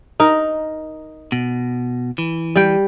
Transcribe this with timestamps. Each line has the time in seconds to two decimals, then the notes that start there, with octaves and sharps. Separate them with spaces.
0.20 D#4 A#4
1.32 B2
2.18 E3
2.56 G3 G5